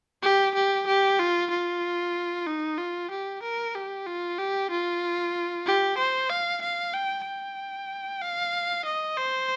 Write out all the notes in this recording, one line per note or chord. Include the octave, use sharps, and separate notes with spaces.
G4
G4
G4
F4
F4
D#4
F4
G4
A#4
G4
F4
G4
F4
G4
C5
F5
F5
G5
G5
F5
D#5
C5